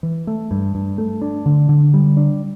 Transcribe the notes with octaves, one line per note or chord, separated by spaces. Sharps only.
E3
A3
G2
G2
A3
D4
D3
D3
G3
D4